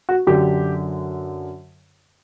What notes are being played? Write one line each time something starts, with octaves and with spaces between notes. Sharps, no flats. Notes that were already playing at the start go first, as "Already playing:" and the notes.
F#4
F#2 D3 G4